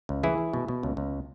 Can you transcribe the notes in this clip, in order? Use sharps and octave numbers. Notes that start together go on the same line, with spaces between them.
C#2
E3 E4 G#4
E3
B2
B2
C#2
C#2